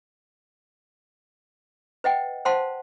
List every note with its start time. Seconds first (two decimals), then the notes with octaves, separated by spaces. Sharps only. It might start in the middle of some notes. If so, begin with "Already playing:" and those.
2.04 B4 D#5 F#5 G5
2.45 C5 F5 F#5 A5 C6